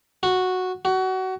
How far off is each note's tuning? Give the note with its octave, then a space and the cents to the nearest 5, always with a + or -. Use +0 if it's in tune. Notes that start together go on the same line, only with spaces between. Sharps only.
F#4 -5
F#4 +25